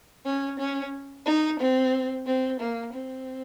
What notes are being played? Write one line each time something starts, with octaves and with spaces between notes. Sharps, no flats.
C#4
C#4
D#4
C4
C4
A#3
C4